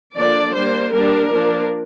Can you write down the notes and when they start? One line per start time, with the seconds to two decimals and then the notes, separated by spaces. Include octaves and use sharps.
0.16 D3 F3 A#3 D4 D5
0.54 G3 A#3 D4 C5
0.93 G3 A#3 D4 A#4
1.32 F3 A#3 D4